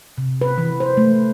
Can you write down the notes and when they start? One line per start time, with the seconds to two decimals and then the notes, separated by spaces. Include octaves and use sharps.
0.18 C3
0.41 B4
0.58 E3
0.80 C5
0.97 A3